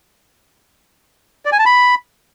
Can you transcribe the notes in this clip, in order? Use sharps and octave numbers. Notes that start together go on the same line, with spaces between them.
D5
G#5
A5
B5